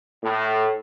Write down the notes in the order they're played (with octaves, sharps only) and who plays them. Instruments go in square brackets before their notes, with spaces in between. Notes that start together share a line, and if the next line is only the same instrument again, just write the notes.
[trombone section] A2